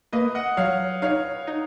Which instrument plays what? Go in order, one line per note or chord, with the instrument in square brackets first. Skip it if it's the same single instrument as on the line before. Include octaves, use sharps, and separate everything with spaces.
[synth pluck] A#3 [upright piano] B4 D#5
[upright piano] D#5 F#5
[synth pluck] F#3 [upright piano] C#5 F5
[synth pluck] D#4 [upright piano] C#5 F5
[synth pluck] D#4